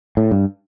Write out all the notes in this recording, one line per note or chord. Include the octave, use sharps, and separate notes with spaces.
A2
G2